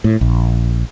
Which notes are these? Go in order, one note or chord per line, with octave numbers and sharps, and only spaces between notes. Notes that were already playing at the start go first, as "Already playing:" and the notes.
A2
A#1